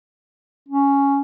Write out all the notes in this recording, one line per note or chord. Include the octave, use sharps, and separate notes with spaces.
C#4